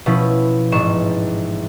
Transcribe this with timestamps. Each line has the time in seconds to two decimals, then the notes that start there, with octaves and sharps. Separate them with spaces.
0.06 B2 F3 C#4 E4
0.72 A1 G#2 C#6 E7